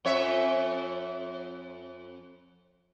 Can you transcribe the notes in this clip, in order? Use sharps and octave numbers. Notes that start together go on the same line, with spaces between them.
F2 C#5 E5